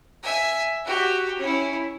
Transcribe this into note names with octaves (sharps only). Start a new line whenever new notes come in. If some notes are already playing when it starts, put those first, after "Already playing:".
E5 G#5
F#4 G4
C#4 E4